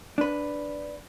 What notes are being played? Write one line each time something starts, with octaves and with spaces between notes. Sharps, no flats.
D4 B4